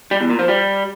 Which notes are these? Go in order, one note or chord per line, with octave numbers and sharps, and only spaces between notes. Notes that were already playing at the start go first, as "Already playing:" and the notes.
G3
E2
A#2
F3
G3